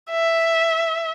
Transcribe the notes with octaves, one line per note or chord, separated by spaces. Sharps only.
E5